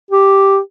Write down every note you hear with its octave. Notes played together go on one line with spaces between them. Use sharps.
G4